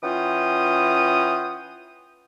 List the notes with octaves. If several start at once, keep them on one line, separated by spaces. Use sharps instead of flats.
E3 C#4 F4 F#5 G5 D#6